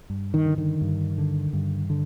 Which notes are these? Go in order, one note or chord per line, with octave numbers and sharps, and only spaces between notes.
G2
D#3
D3
D#3
G2
D3
G2
D3